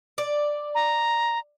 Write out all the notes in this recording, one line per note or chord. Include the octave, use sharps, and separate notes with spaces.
D5
A#5